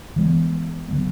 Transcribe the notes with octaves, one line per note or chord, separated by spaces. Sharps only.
E3 G#3 B3
D3 F#3 B3